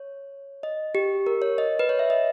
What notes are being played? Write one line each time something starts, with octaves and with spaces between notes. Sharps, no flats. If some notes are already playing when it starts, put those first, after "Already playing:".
Already playing: C#5
D#5
G4
A#4
C#5
D#5
B4
C#5
E5
D#5